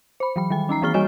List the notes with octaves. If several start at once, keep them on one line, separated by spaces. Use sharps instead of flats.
C5 B5
E3 F#3 B5
D#3 G3 G5
C#4 D#4 A#5 C7
E3 A#3 C4 G#4 F6 G7
G3 F#4 C#5 D#5 C#6